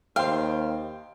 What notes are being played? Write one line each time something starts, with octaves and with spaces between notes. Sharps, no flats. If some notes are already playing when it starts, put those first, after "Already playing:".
D#2 C5 F5 G5